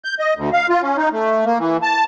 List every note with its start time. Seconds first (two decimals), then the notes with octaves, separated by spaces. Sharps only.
0.05 G6
0.19 D#5
0.36 D2
0.53 F5
0.69 F4
0.82 C#4
0.97 D#4
1.12 A3
1.45 A#3
1.59 E3
1.83 A5